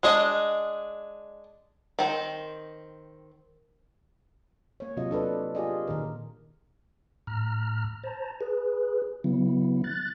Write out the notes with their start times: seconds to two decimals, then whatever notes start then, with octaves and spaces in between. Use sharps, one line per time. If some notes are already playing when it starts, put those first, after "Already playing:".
0.03 G#3 D4 G#4 D#5
1.99 D#3 C4
4.80 A#3 C#5
4.97 C3 F#3 F4 D#5
5.11 D4 A4 B4 D5
5.55 F4 G4 G#4 D5 D#5
5.87 A#2 D#3 A#4
7.27 A2 A#5 F6
8.03 C5 A5 A#5
8.41 G#4 B4
9.24 C#3 F#3 B3 E4
9.84 F#6 A6